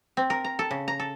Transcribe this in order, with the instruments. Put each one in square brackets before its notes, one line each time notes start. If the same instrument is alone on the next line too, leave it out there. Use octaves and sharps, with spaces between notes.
[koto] C4
A#4
A#5
A4
C#3
A#5
A4